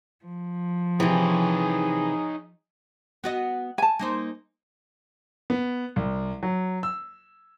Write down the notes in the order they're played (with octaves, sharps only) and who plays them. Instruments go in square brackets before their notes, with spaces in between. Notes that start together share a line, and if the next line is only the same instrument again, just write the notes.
[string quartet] F3
[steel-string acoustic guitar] C3 E3 [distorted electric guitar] D#4 C#5 [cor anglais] G#4
[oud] B3 F#4 D#5
[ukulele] G#5 A5
[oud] A#3 D#4 C5
[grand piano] B3
C2
F#3
E6